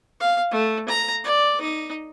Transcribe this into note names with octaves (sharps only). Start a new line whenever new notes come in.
F5
A3
A#5
D5
D#4